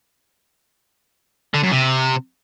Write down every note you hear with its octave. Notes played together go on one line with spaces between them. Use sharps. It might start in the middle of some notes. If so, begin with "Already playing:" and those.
D3
F#2
C3